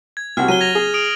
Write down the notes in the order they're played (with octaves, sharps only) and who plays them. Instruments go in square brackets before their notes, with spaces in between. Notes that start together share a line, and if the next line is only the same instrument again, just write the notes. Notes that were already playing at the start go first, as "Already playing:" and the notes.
[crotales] G#6
[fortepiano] C2 F#4 [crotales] F6
[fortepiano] F#3 [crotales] D#7 G7
[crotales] G#6 A#6 F7
[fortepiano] G#4
[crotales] D#6 D7 F7